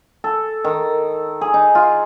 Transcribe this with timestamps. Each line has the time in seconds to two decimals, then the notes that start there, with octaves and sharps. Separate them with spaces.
0.24 A4
0.64 D#3
1.41 G#4
1.54 D#4
1.75 F4